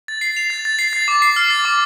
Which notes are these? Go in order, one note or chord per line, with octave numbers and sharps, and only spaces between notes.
A6
C7
F7
A6
A6
C7
A6
D6
C7
F6
A6
D6